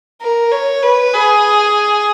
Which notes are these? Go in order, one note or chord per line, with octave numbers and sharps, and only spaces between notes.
A#4
C#5
B4
G#4